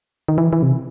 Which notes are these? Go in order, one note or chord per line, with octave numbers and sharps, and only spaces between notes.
D#3
E3
E3
C3